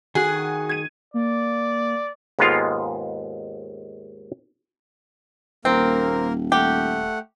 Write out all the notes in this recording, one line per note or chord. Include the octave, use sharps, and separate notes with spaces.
D#3 F#4 G#4 G#5 F#6
G#6 D#7
A#3 D5
D#2 G#2 G#3 B3 F4 F5
D#1 A#3 C4 A#4
A3 G4 F#5